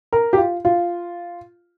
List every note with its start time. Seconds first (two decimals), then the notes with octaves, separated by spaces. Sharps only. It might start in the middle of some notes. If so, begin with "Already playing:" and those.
0.13 A#4
0.33 G4
0.38 F4
0.65 F4